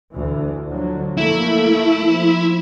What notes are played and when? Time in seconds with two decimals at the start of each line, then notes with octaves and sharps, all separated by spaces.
0.11 D2 E3
0.70 D3 F3 F#3
1.17 A3 A#3 E4
2.07 F3